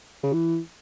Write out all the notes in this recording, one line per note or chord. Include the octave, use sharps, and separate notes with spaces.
C#3
E3